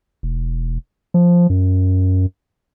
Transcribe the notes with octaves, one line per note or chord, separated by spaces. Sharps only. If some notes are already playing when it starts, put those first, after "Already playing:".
E1
F3
F#2